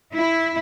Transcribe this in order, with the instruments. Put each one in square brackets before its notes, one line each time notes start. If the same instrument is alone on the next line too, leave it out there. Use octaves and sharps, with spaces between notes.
[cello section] E4